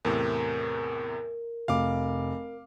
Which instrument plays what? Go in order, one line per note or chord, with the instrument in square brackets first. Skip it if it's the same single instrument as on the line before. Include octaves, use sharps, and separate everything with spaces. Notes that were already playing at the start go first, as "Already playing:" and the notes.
[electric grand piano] E2 A2 C3 [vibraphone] A#4
[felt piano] F1 [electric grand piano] F5 D6